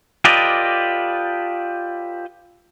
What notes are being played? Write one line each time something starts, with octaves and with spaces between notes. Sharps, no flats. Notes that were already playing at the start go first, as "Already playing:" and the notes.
F4 G4 A4 B4 D5 D#5